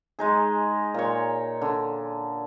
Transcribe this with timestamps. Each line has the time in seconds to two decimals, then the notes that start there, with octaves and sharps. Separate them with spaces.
0.19 G#3 D#4 G#4
0.94 A#2 C#5
1.61 D3